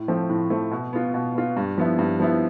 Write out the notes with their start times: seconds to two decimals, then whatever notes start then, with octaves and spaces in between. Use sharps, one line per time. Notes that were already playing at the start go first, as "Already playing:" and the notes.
Already playing: A2
0.08 F3 A3 C4
0.30 A2
0.50 F3 A3 C4
0.72 B2
0.93 B3 F4
1.14 B2
1.35 B3 F4
1.57 G2
1.78 F3 B3 E4
1.99 G2
2.20 F3 B3 E4